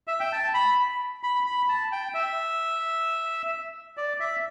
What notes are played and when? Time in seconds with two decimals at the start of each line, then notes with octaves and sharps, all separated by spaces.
0.07 E5
0.20 G5
0.32 A5
0.54 B5
1.23 B5
1.46 B5
1.69 A5
1.92 G5
2.14 E5
3.97 D5
4.20 E5